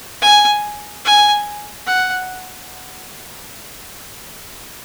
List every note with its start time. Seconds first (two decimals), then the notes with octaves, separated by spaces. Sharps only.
0.22 G#5
1.05 G#5
1.87 F#5